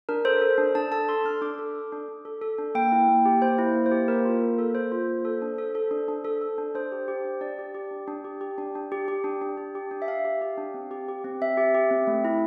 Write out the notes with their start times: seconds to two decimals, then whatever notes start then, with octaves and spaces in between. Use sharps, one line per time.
0.09 D4 A#4
0.25 A4 C5
0.41 A4
0.58 D4
0.75 D4 A5
0.92 A4 A5
1.09 A4 C6
1.25 D4 F6
1.42 D4 D6
1.59 A4
1.75 A4
1.92 D4
2.08 D4
2.25 A4
2.42 A4
2.58 D4
2.75 A#3 G5
2.92 E4
3.08 A#3
3.25 G4
3.42 A#3 C5
3.58 E4
3.75 A#3
3.86 C5
3.91 G4
4.08 A#3 A#4
4.25 F4
4.41 A#3
4.59 A4
4.75 A#3 C5
4.92 F4
5.08 A#3
5.25 A4
5.42 D4
5.58 A4
5.75 A4
5.91 D4
6.08 D4
6.25 A4
6.41 A4
6.58 D4
6.75 D4 C5
6.92 G4
7.08 G4
7.24 D4
7.41 D4 D5
7.59 G4
7.75 G4
7.91 D4
8.08 D4
8.24 G4
8.41 G4
8.58 D4
8.75 D4
8.92 G4
9.08 G4
9.24 D4
9.41 D4
9.57 G4
9.75 G4
9.91 D4
10.02 E5
10.07 D4 F5
10.25 G4
10.41 G4
10.58 D4
10.74 C4
10.91 G4
11.08 G4
11.24 C4
11.41 C4 E5
11.57 G4
11.75 G4
11.91 C4
12.07 A3
12.25 E4